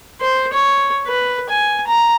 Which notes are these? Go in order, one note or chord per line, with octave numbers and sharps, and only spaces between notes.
C5
C#5
B4
G#5
A#5